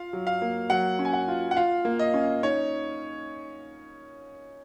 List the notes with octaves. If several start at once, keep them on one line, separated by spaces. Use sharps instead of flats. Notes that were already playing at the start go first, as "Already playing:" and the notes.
Already playing: F4 F5
F#3
F5
A#3
F#3 F#5
C#4
G#5
F#5
F4
F#5
F4 F5
A#3
D#5
C#4
D#4 C#5